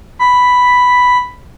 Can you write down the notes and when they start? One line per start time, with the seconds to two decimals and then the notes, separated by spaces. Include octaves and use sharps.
0.19 B5